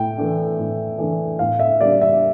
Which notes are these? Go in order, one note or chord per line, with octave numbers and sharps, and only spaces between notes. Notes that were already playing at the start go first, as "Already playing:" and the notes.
Already playing: A2 G5
E3 A3 D4
A2
E3 A3 D4
A2 F5
E5
G3 A#3 D4 D5
E5